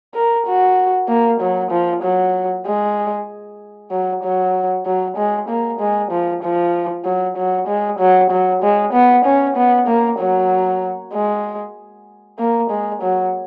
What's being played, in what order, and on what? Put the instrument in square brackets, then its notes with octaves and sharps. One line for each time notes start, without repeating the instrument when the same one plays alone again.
[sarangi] A#4
F#4
A#3
F#3
F3
F#3
G#3
F#3
F#3
F#3
G#3
A#3
G#3
F3
F3
F#3
F#3
G#3
F#3
F#3
G#3
B3
C#4
B3
A#3
F#3
G#3
A#3
G#3
F#3